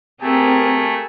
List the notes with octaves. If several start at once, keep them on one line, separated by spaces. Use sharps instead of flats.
A3 C4 G4 G#4 A#4 G#5 A5 E6